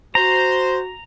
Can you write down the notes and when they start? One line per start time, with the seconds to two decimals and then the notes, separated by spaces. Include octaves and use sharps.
0.15 F#4 C5 A#5